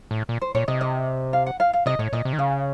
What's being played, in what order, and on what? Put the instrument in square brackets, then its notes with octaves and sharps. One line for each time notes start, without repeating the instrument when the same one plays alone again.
[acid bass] A2
A#2
[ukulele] C5
[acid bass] A#2 [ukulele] C#5
[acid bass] C3 [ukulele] D#5
[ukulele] D#5
F5
F#5
F5
F5
[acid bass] C3 [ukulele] D#5
[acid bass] A2 [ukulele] C#5
[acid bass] A#2 [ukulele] D#5
[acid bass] C3
D#3
[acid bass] C#3 [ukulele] F5